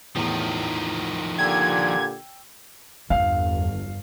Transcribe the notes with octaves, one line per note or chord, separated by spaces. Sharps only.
E2 A2 D#3 F3
A#2 D3 G4 G5 E6 G#6
G1 E2 F5